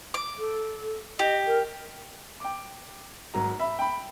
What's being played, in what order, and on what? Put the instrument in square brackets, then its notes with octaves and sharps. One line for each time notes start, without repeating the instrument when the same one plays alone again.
[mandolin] D6
[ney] A4
[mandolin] G4 [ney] D#5
[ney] A#4
[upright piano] G5 D6
G#1 F#3 A#5
E5 B5
G5 B5